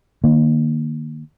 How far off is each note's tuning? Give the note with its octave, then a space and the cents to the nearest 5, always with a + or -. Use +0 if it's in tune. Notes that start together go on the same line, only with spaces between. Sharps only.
D#3 -35 A#3 +0